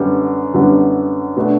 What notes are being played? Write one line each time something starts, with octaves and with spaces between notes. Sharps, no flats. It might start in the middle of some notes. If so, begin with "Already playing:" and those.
Already playing: F#2 D3 G3 B3
F#2 D3 G3 B3
B2 A3 D4